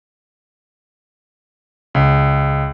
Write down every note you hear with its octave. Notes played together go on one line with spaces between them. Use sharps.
C#2